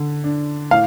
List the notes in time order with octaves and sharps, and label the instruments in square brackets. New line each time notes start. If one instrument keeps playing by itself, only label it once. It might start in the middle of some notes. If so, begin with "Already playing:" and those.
Already playing: [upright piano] D3
D4
[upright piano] A2 [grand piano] F5